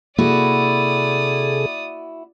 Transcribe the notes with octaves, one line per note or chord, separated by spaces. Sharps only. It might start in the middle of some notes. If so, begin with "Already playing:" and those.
C3 A#3 E4 F#4 G#4 A4 D5 D#6